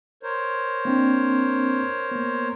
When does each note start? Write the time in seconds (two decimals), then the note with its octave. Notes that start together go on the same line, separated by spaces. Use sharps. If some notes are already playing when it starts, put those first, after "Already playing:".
0.23 A#4 C5 C#5
0.85 A#3 C4 D4
2.11 A#3 B3